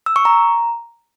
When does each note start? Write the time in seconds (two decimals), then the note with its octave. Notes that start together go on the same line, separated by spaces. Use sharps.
0.06 E6
0.16 C#6
0.25 A#5